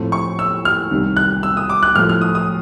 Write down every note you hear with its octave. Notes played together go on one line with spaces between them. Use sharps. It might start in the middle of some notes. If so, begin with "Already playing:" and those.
Already playing: A2 F3 A3 C4
C#6
E6
F6
C2 C3 D#3
F#6
E6
D#6
D6
F#6
A2 F3 A3 F6
F6
D#6
D#6